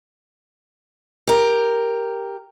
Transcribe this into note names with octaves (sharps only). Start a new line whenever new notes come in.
G4 A#4